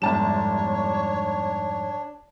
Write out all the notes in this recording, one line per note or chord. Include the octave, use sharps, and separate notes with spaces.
G1 F2 G#2 G3 D4 C#5 A5 E7